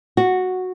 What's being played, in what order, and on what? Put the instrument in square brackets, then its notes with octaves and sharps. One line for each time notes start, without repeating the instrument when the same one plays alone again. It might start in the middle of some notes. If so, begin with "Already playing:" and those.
[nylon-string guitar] F#4